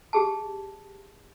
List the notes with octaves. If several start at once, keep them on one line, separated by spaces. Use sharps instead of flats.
G4 G#4 A5